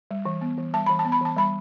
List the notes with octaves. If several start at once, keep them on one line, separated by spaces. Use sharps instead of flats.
G3
E3
B3
E3
G3 A5
E3 B5
A5
B3
B5
E3 A5
G3 B5